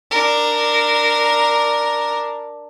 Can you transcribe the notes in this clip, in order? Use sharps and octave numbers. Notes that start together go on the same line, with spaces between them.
D4 A#4